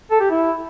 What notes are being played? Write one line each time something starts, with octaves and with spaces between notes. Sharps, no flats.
A4
G4
E4